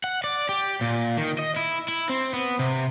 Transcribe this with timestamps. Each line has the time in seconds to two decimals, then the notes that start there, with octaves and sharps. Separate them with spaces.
0.04 F#5
0.24 D5
0.49 G4
0.81 A#2
1.17 D#3
1.39 D#5
1.56 E4
1.88 E4
2.09 C4
2.33 B3
2.59 C3